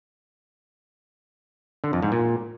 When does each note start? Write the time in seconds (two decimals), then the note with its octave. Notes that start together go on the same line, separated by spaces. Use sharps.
1.84 D3
1.93 F2
2.03 G#2
2.12 A#2